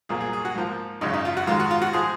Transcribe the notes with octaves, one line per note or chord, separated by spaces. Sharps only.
C2 A#2 F#3 A#3 G#4
G#4
G#4
F#4
G#2 F3 A#3
G#1 F#2 C#3 D#4
D#4
F4
F#4
G#2 D#3 G#3 F4
F#4
F4
F#4
F3 G#3 G#4